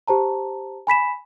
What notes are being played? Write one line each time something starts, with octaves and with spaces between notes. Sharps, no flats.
G4 C5 A5 A#5
G#5 B5 B6 E7